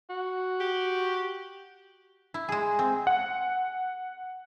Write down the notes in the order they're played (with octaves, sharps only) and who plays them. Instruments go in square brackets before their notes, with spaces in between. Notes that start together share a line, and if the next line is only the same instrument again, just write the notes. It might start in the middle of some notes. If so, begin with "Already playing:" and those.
[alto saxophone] F#4
[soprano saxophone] G4
[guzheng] E4
G#3 G#4
C4
[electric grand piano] F#5